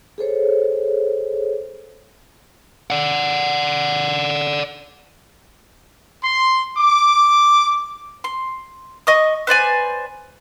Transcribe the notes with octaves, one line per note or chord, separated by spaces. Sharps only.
G#4 A4 C5 C#5
D5 F#5
C6
D6
C6
D#5 C#6 D#6
B4 C5 D5 G#5